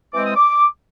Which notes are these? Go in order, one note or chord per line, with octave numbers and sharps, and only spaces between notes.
E3 G#3 C4 D6
D#6
D6